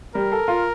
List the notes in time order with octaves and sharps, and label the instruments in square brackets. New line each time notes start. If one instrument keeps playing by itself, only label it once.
[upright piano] G3 [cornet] A#4
[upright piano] A4
F4